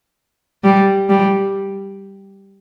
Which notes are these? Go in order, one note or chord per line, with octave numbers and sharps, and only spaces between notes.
G3
G3